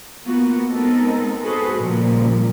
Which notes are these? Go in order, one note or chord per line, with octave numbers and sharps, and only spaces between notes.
A#3 B3 F4 F#4
G#3 B3 C4 D#4 A4 A#4
F#4 G#4 A4 B4 C5
A#2 C#3 F3 G3